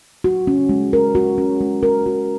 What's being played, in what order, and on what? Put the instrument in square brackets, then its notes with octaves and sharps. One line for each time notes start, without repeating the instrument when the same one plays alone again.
[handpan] F#4
C#4
G#3
A#4
F#4
C#4
G#3
A#4
F#4